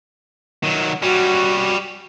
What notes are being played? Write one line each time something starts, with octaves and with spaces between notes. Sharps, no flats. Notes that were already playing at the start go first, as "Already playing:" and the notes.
D#3 F#3
G3 C#4 F#4